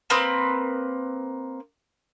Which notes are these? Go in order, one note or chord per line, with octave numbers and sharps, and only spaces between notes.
A#3 C4 B4 D#6